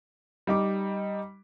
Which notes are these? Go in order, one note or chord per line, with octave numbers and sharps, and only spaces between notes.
G3 D#4 D6